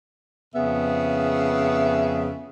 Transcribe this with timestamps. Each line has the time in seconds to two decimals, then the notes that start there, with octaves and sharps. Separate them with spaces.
0.54 F2 C#3 B3 G#4 E5